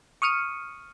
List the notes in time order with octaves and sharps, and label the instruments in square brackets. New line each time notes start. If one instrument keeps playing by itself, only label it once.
[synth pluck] C#6 D#6 F6 C#7 D#7